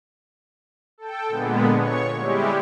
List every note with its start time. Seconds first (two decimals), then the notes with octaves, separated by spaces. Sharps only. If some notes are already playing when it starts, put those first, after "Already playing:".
0.98 A4 G5
1.28 A#2 D3 G#3 B3
1.76 C#5 C#6
2.18 G3 G#3 E4 G4